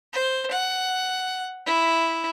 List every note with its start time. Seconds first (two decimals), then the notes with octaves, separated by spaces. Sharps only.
0.13 C5
0.51 F#5
1.66 E4